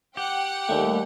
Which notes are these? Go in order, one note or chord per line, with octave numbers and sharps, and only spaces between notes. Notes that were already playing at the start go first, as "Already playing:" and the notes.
G4 F#5 G5
D#2 G3 A3